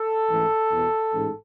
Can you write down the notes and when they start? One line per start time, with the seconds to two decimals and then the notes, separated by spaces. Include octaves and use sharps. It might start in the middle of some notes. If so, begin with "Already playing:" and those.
Already playing: A4
0.30 A1 G#2 E3
0.72 E2 B2
1.13 A1 G#2